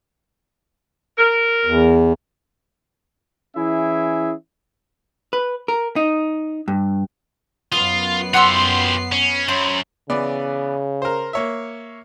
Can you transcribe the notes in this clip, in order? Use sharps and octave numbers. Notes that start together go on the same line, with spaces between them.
A#4
E2
E3 C#4 E4 G#4 E5
B4
A#4
D#4
G2
F#2 B3 F4 D#6 C7
F4 G4 F#5 C6 E6
C#4
F#2 C5 C#5 B5
C#3 E3 B3 D5
A#4 C5
A#3 C#5 E5